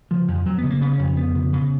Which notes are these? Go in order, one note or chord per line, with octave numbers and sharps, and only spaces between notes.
C#3 F3
F2
F3
F2 F#3
B3
C#3
A#3
C#3 B3
C#4
F2
F2 B3
C#3
C#3